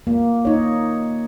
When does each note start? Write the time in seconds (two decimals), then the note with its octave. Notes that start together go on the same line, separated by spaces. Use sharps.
0.07 A#3
0.45 D#4 C#5